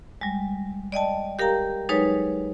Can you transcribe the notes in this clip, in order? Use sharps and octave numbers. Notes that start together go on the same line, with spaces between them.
G3 G#3
D5 D#5 G5 A5
G4 A#4 F5 G5 A#5
F#3 G#3 D#4 G#4 B4 C#5